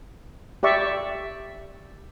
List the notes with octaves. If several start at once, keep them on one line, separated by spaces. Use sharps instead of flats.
G4 D5 E5 C#6